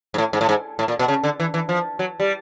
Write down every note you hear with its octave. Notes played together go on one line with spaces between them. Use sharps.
G#2
A2
G#2
A2
G#2
A2
A#2
B2
C#3
D3
E3
E3
F3
F#3
G3